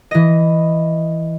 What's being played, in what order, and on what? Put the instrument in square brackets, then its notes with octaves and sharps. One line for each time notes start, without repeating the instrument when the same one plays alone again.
[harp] E3 D#5